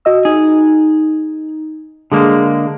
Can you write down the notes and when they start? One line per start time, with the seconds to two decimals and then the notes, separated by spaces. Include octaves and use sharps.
0.05 F#4 D#5 E6
0.25 D#4 G#4
2.12 D3 G#3 A#3 G#4